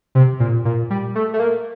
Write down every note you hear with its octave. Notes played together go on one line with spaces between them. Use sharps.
C3
A#2
A#2
G3
A3
A3
A#3